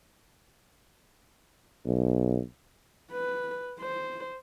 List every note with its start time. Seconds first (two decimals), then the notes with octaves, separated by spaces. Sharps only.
1.86 B1
3.11 B4
3.80 C5